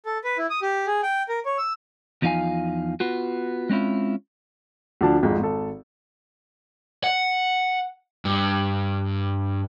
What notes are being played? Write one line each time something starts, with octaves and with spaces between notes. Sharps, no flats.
A4
B4
E4
D#6
G4
G#4
G5
A#4
C#5
E6
E2 F3 D#4 F4 F5 G#5
B3 F4 F#4
G#3 C4 C#4 E4 F4
D2 F3 D4 A5
G#1 F2 G#2
G#1 A4
F#5
G2